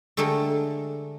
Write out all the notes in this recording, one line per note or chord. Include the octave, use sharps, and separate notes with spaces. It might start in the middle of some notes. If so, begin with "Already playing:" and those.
D3 G#3 A3 G4 A4 A#4